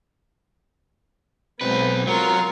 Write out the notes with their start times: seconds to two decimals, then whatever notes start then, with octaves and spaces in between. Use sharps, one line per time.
1.61 B1 G#3 B3 C4 B4
2.07 F#3 F4 A#4